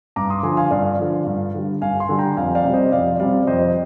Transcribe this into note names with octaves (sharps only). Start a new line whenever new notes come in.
G2 A#5 D6
C6 D#6
D3 F3 G#5 C6
F5 G#5
G2 D5 F5
D3 F3
G2
D3 G3
G2 F5 G#5
G#5 C6
D3 G3
G5 A#5
F2 F5 G#5
D5 F5
C3 G3
C5 D#5
F2 D5 F5
C3 G3 D5 F5
F2 C5 D#5